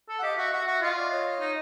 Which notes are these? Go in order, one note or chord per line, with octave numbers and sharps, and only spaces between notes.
A4
F#5
G4 D#5 F5
F#4 E5 F#5
F#4 E5 F#5
F#4 E5 F#5
F4 D#5 F5
D5 E5
C#5 D#5
D#4